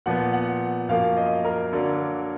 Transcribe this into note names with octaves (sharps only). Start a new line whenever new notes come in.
A#2 F3 B3 F#5
F#5
F#2 F3 A#3 F5
D#5
A#4
D3 F#3 A#3 D4